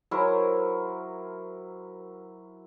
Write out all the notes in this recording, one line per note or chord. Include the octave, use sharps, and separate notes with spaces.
F#3 E4 A#4 C5